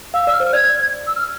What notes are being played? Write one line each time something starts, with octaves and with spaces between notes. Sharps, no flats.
F5 E6
D5 E6
F6
C5
F6
D5 G#6
E6
F6